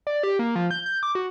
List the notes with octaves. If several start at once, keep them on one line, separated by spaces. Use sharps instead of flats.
D5
G4
A#3
F3
G6
G6
D6
F#4